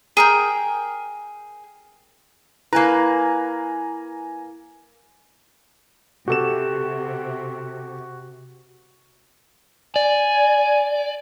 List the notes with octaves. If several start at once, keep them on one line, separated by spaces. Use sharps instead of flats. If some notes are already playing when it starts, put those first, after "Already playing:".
G#4 A#4 G5
A#3 E4 B4 G#5 A#5
C3 F#4 G4 A4 E7
D5 G#5